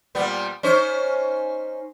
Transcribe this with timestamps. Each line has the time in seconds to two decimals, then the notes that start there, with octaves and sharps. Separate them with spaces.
0.15 A#2 G3 B3
0.63 C#4 D#4 C5